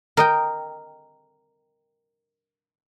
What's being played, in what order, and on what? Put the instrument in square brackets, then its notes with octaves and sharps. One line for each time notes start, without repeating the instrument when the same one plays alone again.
[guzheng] A#4 D#5 G5